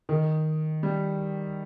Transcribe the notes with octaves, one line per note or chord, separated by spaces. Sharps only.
D#3
G3